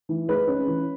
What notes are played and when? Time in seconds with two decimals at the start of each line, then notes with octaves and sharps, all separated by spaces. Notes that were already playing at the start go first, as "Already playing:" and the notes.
0.09 E3
0.28 G#3 B4
0.47 C#4
0.67 E3